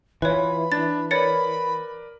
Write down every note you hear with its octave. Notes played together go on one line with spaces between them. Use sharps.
E3 F4 B4 C#5 B5
D4 A6
A#4 B4 C#5 D5 B5 A6 C#7